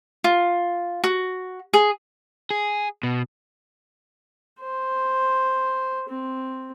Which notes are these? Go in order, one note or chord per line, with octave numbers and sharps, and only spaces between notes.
F4
F#4
G#4
G#4
B2
C5
C4